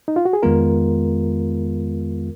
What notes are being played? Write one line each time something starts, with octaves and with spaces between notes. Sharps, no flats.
D#4
F4
F#4
G#4
F2 D#3 G#3 B3 F4 A#4